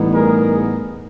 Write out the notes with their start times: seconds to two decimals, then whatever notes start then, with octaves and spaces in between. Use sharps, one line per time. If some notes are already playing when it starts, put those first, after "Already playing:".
Already playing: A2 E3 G3 B3 D#4
0.13 G#4 A#4